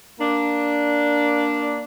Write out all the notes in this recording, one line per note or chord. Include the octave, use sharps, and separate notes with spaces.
A#3 D4